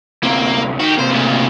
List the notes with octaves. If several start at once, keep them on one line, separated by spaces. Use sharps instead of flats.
D2 C3 A#3
D#3 F#4 G4
C3 A#3 C5
D2 C#3